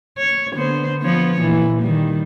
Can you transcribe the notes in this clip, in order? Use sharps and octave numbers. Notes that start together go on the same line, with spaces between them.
C#5
D3 B3 C5
F3 B3 C#5
A#2 E3
D#3 G3